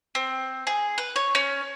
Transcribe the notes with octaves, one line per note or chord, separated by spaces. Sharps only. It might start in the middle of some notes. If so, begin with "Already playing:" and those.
C4
G#4
B4
C#5
C#4